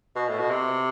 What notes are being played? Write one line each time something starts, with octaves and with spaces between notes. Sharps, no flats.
B2
A2
B2
C3